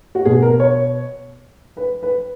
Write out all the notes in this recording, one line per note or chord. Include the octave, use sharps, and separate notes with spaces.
F#4
B2 G#4
A#4
C#5
B4
B4